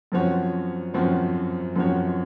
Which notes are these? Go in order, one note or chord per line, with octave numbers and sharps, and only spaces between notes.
F#2 F3 C4 F#4 C#5
F#2 F3 C4 F#4 C#5
F#2 F3 C4 F#4 C#5